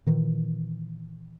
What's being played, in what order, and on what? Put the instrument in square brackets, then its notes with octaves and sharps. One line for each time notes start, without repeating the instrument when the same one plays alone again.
[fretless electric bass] A#2 D#3 E3